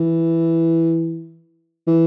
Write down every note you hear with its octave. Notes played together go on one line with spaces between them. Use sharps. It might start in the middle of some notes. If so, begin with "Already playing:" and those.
Already playing: E3
E3